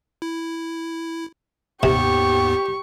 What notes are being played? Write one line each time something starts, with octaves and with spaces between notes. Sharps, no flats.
E4
D#2 G#2 C3 B3 G4 C#6